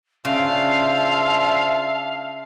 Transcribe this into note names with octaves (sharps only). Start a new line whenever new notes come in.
C#3 D4 F4 C5 E5 F5 A5